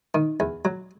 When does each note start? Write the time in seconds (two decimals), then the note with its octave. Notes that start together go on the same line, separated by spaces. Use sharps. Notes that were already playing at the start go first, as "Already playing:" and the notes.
0.15 D#3
0.40 E2
0.65 F#3